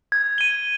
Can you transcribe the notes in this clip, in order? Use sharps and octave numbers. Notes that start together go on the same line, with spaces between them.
G#6
D#7 G7